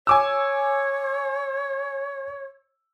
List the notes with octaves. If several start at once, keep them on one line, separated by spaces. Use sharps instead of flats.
C#5 G#5 D6 E6